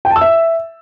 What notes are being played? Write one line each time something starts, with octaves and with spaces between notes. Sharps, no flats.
G5
A5
E6
E5